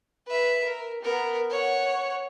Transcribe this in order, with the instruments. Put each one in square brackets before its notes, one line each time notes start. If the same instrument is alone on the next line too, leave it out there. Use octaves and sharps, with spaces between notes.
[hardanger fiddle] B4 E5
A#4
B3 A#4
C#5 F#5